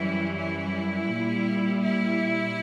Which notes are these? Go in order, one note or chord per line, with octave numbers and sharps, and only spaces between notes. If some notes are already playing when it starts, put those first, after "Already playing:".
Already playing: F#2 E3 G3 E4
E4
A#2 G3
E4